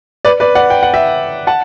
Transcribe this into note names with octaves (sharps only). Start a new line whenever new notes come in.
B4 D5
B4 D5
D5 F#5
G5
F#5
E5 G5
F#5 A5